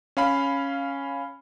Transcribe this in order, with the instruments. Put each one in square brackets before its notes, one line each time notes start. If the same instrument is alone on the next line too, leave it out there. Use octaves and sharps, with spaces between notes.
[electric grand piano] C#4 F5 B5